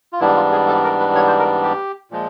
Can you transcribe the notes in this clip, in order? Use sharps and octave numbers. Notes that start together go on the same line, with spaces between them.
F4
G#2 E3 G3 B3 D4 E4
F4
G#4
A4
A#4
B4
C#5
C5
A#4
G4
A#2 F3 G#3